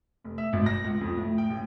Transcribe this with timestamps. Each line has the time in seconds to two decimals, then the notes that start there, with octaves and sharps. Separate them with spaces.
0.24 F1
0.38 E5
0.53 G#1
0.66 A#6
0.84 C#2
1.01 F2
1.17 A2
1.38 G5
1.50 A1